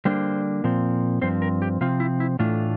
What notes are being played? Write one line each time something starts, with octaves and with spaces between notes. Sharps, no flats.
D3 G3 A#3 D4 C5
A#2 F3 C4
G2 F3 C4 C5
A#4
G4
C3 F3 C4 F4
E4
E4
A2 E3 A3 D4 F4